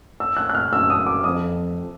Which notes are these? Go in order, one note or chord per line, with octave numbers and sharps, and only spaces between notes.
E6
F#6
F#6
F6
F#2 E6
D#6
D6
F2 D#6